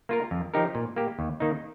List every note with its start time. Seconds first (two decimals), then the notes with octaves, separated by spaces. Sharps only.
0.09 A#3 F4 A#4
0.31 F2
0.54 F3 D#4 G4 A#4
0.75 A#2
0.96 A#3 G4
1.19 D#2
1.40 D#3 A#3 D#4